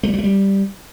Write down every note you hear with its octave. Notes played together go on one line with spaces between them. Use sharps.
A3
G3
F#3
A3
G3